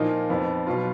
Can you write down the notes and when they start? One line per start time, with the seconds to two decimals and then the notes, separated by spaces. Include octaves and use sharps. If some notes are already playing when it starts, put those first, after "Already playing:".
Already playing: A#2 F3 A#3 D#4 F4
0.29 F2 F3 B3
0.67 B2 F#3 B3 F4